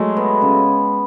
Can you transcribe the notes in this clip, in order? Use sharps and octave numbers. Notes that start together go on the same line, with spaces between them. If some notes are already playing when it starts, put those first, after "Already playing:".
Already playing: F#3 G#3 A3
B3
C#3